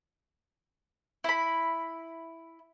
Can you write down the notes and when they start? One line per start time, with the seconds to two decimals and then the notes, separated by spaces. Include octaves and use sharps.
1.24 E4 B5